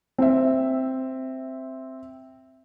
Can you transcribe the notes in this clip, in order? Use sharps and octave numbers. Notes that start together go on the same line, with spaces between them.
C4 E5